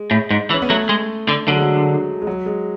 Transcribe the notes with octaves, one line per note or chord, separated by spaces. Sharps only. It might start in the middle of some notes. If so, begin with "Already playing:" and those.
Already playing: G#3
A2
G#2
E3
C#4
B3
F#3 A3
G#3
D3
D3 F#3
G#3
F#3
G#3
F#3
G#3